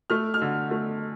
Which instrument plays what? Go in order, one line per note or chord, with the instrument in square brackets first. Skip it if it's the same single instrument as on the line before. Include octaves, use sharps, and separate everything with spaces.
[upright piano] A3 F6
F6
D3
A3